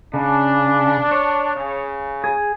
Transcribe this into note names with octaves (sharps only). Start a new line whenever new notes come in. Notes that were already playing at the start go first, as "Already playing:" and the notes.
C#3 D4
C#5
C#3
G#4